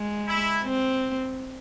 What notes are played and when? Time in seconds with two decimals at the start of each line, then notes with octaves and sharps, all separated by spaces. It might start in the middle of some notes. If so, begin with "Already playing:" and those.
Already playing: G#3
0.27 E4
0.64 C4